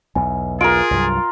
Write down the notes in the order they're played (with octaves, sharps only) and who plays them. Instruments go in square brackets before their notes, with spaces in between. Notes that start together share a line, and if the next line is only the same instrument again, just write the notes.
[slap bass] B1 E2 [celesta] G#5
[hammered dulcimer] F4 A#4 [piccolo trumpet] G#4 [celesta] D7
[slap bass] C2 G2 F#3